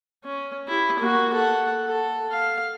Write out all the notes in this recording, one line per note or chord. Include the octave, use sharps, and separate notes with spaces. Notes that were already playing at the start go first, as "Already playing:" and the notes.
C#4
E4 G4
A#3 F#4
A4 F#5
A4
F5